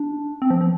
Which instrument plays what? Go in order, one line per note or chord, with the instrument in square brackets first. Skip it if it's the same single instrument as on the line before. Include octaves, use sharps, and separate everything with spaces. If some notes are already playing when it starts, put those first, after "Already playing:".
Already playing: [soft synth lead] D4
C4
F3
F3